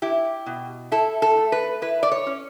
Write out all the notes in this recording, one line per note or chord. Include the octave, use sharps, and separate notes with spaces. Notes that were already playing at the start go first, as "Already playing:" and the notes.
E4 G4
B2
E4 A4
A4
A3
B4
E4 B4
D5
C#5
C#4